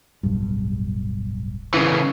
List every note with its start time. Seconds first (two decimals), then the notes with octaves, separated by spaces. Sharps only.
0.23 D1 B1 G2
1.74 C#3 E3